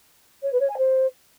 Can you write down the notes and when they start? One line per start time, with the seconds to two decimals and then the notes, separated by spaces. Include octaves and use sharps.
0.43 C#5
0.52 B4
0.60 C#5
0.69 G#5
0.77 C5